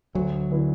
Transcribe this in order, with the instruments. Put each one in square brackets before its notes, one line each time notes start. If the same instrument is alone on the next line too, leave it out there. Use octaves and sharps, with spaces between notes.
[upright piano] D2 [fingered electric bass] F#3
[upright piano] D3 B3 E4